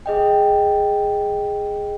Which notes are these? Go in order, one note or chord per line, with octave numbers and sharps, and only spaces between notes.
G#4 D#5 G5